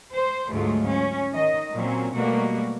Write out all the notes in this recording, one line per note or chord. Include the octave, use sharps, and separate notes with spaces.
C5
D2 G#2 F#3 G#3 A3 F4
C#4
D#3 D#5
A#2 F#3 A#3 C4 C#4
B2 F#3 G3 A3 A#3 F#4